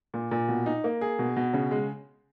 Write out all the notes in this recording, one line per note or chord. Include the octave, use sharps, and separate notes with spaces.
A#2
A#2
B2
D#4
A#3
G#4
B2
B2
C#3
G#3